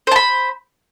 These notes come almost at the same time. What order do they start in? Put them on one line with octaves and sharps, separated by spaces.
C5 A5 B5